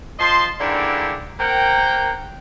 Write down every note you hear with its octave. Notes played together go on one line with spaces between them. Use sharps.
F3 D#5 A5 C6
G#2 D3 A#3 D4 E4 G4
A#3 C4 A#4 F#5 G5